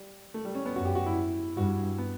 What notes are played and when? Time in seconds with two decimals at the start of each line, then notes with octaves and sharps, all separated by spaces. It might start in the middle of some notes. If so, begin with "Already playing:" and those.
Already playing: G3
0.34 A3
0.45 G3
0.55 C#4
0.65 B3
0.76 F#2 F#4
0.85 G4
0.95 F#4
1.06 E4
1.57 G2 F#4
1.98 B3